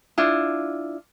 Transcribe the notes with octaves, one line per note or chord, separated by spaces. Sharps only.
D4 E4 F4